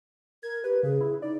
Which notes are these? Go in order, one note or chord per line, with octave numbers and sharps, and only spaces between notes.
A#4 G#6
G4 B4
C#3 G#4
E4
D#4 D5